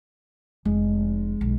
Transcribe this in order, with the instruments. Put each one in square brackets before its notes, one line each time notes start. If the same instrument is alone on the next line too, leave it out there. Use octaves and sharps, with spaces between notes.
[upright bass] F1 [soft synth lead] G#3
[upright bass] B1